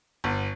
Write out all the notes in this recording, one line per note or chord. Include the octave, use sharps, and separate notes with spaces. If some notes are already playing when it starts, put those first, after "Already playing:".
G1